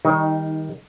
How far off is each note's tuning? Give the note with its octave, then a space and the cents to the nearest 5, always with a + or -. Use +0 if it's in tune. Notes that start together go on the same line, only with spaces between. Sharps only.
D#3 +20 G3 +20 D#4 +0